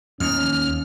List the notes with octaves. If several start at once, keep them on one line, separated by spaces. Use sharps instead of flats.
D#2 C#4 F6